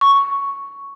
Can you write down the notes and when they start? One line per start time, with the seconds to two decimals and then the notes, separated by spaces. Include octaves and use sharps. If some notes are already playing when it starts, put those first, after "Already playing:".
0.01 C#6